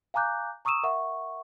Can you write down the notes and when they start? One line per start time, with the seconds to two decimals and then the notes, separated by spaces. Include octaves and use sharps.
0.14 F5 G#5 A#5 D6 F#6 G6
0.65 A#5 C#6 D#6 E6 D#7 E7
0.83 A#4 E5 F#5 C#6